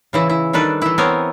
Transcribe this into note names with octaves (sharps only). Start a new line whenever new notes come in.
C#3 E3 E4
E4
D#3 G3 D4 A4 B4
E3 E4
B3 C4 A#4 C#5 G#5